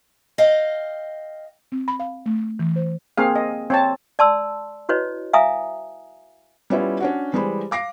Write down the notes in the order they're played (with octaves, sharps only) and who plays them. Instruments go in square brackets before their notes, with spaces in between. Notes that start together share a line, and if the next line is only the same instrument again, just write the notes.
[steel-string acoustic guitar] D#5 F5 G5
[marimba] C4
B5
F5
A3
E3
C5
[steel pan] A#3 C4 G#4 F5
D#5
C4 C#5 A5
[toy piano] D5 A5 C6 E6
E4 F#4 B4 C#5 D#5
E5 F5 G#5 A#5 D#6
[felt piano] G3 B3 C#4 E4 F4
C#4 D4 F#4
E3 G3 G#3 C5 B5
F5 D6 A#6 C7